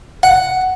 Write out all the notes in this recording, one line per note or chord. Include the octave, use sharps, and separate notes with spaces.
F#5